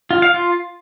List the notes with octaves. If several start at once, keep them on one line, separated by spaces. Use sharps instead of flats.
F4
F5
F4